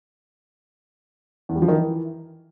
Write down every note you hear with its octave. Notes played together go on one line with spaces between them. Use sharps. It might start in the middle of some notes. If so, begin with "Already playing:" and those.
E2
G3
F3
D#3
E3